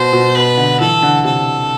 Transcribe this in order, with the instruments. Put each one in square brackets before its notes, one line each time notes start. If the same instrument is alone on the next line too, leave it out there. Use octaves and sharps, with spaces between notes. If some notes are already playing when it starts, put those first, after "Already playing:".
Already playing: [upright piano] B2 [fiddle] C5
[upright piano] B2
[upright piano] B2 [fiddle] B4
[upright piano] D3
[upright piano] E3 [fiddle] A4
[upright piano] D3
[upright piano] C3 [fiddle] A4